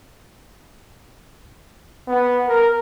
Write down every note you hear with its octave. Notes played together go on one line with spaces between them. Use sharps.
B3
A#4